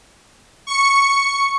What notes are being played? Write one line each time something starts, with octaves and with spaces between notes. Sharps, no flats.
C#6 C#7